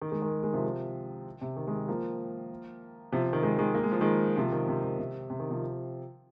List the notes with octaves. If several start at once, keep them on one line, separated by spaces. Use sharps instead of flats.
D#3
D#3 G#3
D#3 G#3
D#3 G#3
C3 F3
C3
D#3
D#3 G#3
F3 A#3
C3 F3
D#3
D#3 G#3
D#3 G#3
A#3
G#3
F3
D#3 G#3
C3 F3
D#3
C3
D#3
C3
C3
D#3
C3 F3